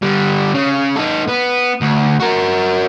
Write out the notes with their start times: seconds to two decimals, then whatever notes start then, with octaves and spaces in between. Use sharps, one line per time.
0.03 D3 G3
0.54 C#3
0.96 D#4 A4
1.28 B3
1.82 D2
2.20 F#4 A#4